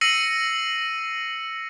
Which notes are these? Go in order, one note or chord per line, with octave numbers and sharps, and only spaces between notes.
E6 A#6 C7 C#7 D#7 F#7